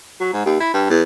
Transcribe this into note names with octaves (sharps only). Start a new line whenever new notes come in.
F#3
G#2
D#2
E4
G2
E2